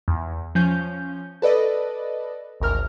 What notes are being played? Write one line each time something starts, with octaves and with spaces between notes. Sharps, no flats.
E2
F3 C#4 G6
A4 B4 D5 D#5
G#1 D2 A#4 F6